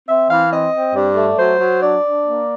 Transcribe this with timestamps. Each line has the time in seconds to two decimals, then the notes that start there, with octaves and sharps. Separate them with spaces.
0.09 C4 E5
0.30 E3 F5
0.51 C4 D#5
0.74 C4
0.94 G2 D5
1.16 A3
1.38 F#3 C5
1.59 F#3
1.82 D4 D5
2.04 D4
2.25 A#3